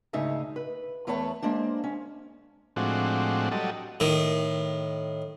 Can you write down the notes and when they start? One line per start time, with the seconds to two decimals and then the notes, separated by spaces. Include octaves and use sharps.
0.13 D2 G#2 C#3 D#4 E5
0.56 B4
1.07 E2 A3 B4 C#5 A5
1.42 G#3 A#3 D4 C5
1.84 C#4
2.76 A2 F3 G#3 C4 D4 F#4
3.51 F#3 G3 A4 D#5
4.00 A2 D#3